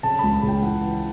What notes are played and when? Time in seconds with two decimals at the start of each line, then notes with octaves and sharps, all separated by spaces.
0.03 C#3 A5
0.19 C#2 B5
0.34 B5
0.43 C#3
0.48 G5
0.63 E3 F#5